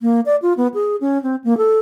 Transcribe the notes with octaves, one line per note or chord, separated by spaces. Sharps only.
A#3
D5
F4
B3
G#4
C#4
C4
A#3
A4